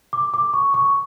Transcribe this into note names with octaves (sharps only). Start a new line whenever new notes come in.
D6
D6
C#6
C#6